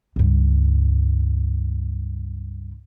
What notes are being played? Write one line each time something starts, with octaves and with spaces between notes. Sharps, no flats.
C#2 G2